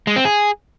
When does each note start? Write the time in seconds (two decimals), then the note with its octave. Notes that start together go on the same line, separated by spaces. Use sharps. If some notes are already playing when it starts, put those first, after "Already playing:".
0.07 G#3
0.16 C4
0.25 G#4